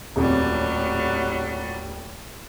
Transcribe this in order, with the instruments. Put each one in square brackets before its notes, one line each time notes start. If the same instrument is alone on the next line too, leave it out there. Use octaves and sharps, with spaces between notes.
[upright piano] D#1 F2 [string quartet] A2 F#3 G3